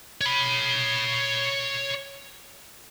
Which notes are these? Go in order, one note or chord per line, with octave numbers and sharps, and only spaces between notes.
C#5 B5